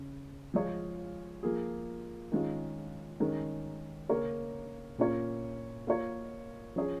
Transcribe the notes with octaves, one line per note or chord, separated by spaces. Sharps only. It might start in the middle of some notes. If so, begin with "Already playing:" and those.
Already playing: C#3
F3 G#3 F4 G#4 C#5
F3 A#3 F4 G#4
D#3 G#3 C#4 F4
D#3 G#3 C#4 A#4
C#3 A#3 C#4 A#4 C#5
A#2 A#3 C#4 F4 C#5
A#3 F4 A#4 C#5
F3 C#4 G#4 C#5